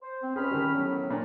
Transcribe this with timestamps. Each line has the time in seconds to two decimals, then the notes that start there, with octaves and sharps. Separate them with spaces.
0.02 C5
0.23 C4
0.36 C#2 C#4 G#4 B5 F6
0.51 D#3 G3
0.75 A2 F#3 B3 D4
1.10 A#2 D4